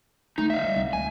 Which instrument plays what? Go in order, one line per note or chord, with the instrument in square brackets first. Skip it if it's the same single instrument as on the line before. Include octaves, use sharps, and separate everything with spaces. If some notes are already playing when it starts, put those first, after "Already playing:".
[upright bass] A3 [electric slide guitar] D#4
[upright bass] E3 [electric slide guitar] E5 F5
[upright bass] G3
C2
[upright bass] D2 [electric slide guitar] G#5